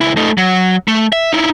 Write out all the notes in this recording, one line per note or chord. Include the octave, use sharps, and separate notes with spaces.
C#2 E4
A3 D#4
F#3
A3
E5
D#4 E4